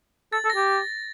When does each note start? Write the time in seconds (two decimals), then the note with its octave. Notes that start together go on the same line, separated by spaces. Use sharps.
0.32 A4 A6
0.45 A4
0.50 A#6
0.55 G4